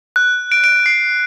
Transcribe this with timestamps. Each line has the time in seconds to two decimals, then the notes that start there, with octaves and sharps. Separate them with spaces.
0.16 F#6
0.52 D7
0.64 D7
0.86 C7